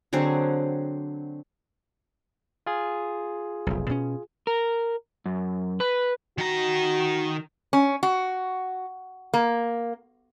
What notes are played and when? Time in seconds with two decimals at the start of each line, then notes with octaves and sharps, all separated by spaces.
0.13 D3 F#3 C4 G#4
2.66 F4 G#4
3.67 F1 B1
3.90 B2 C#4
4.47 A#4
5.26 F#2
5.80 B4
6.38 D#3 F#4 A#5
7.73 C#4
8.03 F#4
9.34 A#3